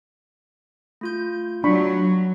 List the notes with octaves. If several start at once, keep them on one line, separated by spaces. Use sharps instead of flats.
A3 F4 G6
F#3 D4 B5 C#6